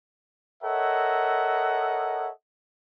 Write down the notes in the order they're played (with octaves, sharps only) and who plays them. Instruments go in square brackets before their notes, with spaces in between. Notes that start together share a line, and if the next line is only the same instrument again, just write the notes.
[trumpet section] A4 A#4 C#5 D#5 E5 F#5